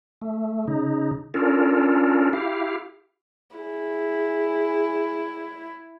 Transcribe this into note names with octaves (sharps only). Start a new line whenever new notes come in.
A3
C#3 D#4
C#4 D4 F4 A4 A#4
E4 G4 F5
E4 G#4